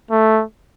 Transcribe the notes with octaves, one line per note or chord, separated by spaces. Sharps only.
A3